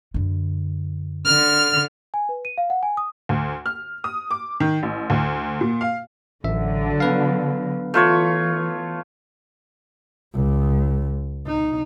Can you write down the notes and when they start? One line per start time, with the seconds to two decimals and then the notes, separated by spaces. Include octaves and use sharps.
0.14 F#2 D3
1.26 D3 F6
2.14 G#5
2.29 B4
2.45 D#7
2.58 F5
2.70 F#5
2.83 G#5
2.97 D#6
3.29 D2
3.66 F6
4.04 D#6
4.31 D6
4.60 D#3
4.83 A1
5.10 D2
5.61 A#2
5.81 F5
6.44 A1 D3 F#3 E5
7.00 B3 B4 F5
7.94 E3 A3 F4 C#5
10.33 C#2
11.47 D#4